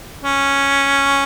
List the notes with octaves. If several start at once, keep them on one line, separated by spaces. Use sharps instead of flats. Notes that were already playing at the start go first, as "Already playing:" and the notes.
C#4